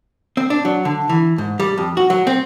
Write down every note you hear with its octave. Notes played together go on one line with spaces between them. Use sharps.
C4
D4
F#3
D3
E3
G#2
G3
F2
F#4
F#3
C4